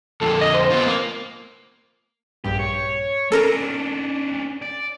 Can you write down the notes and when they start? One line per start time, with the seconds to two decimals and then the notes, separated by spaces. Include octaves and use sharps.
0.21 F2 A#2 D3 A4
0.41 D#5
0.54 C5
0.70 B3 C4 F4
0.87 A#3
2.44 A#1 G2 G4
2.59 C#5
3.32 C#4 D4 A4 A#4 A#5
4.62 D5